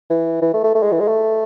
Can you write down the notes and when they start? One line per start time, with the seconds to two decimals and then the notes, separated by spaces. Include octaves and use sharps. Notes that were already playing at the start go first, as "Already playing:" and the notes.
0.10 E3
0.42 E3
0.54 A3
0.64 A3
0.75 A3
0.83 G#3
0.92 E3
1.00 G#3
1.08 A3